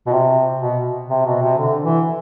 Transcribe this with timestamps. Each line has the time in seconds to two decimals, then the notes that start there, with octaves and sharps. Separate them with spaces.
0.07 B2
0.12 C3
0.61 B2
1.10 C3
1.26 B2
1.42 C3
1.58 D3
1.83 E3